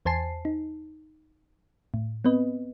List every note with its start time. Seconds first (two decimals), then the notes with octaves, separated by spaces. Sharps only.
0.06 E2 C5 G#5 A5 C7
0.45 D#4
1.94 A2
2.25 B3 C4 B4 D#5